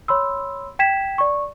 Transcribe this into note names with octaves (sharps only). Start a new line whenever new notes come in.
C#5 B5 C6 E6
G5 G#6 B6 E7
D5 C#6